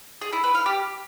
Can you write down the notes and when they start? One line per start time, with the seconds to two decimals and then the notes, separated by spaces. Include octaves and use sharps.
0.21 G#4
0.33 E4
0.44 B4
0.55 F5
0.66 G4